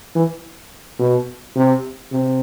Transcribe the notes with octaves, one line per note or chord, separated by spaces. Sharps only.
E3
B2
C3
C3